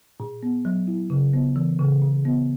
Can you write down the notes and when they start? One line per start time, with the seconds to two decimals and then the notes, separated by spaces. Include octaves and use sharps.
0.20 A#2
0.43 B3
0.65 F#3
0.87 E4
1.10 C#3
1.33 B3
1.56 E3
1.79 C#3
2.02 A#2
2.25 B3